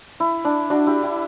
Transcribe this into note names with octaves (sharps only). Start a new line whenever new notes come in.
E4
D4
D4 F#4
E4 G4
E4 G4